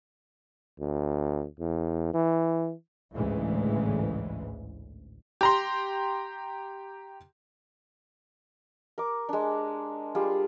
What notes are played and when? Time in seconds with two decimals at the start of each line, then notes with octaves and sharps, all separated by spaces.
0.80 D2
1.60 E2
2.14 E3
3.13 A1 D2 G#2 C#3 E3 G#3
5.41 G4 A#5 C6
8.98 A#4 D6
9.29 G#3 D4
10.15 G3 F4 G#4